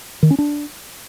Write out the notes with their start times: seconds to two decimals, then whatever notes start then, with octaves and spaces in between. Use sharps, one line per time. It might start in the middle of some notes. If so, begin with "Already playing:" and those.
0.23 D#3
0.31 C#4
0.38 D4